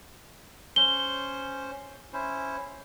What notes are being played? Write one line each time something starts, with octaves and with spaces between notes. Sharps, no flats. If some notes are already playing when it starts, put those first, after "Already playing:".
C#4 C5 G7
C#4 E4 C5